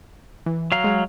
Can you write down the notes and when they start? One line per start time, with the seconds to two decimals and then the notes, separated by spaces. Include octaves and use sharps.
0.46 E3
0.72 F#3 F5 A#5
0.84 G#3